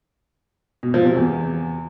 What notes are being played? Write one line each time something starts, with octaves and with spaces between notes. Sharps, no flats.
B2
F3
C3
E2